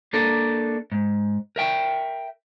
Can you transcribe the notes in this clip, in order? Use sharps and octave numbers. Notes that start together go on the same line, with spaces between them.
A#3 D4 A4 A#4
G#2
A#4 E5 G5